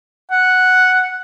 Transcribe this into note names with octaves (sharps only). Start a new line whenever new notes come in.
F#5